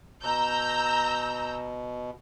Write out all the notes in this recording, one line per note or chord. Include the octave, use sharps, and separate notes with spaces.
B2 A#5 E6 G6